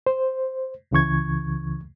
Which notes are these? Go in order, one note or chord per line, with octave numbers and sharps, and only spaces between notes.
C5
C#2 C#3 E3 C#6 G#6